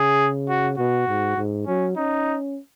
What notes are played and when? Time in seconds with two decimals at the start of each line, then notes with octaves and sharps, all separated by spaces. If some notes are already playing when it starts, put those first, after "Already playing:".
Already playing: C#3 G#4
0.49 F#4
0.78 B2 F#4
1.07 G#2
1.37 G#2
1.67 F#3 C#4
1.96 C#4 D#4